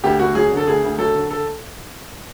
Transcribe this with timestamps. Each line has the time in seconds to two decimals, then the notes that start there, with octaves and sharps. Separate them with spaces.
0.04 D2 G4
0.19 D2 F#4
0.35 F#3 G#4
0.52 D3
0.57 A4
0.67 D2 G#4
0.83 D2
0.98 F#3 A4
1.15 D3
1.30 A4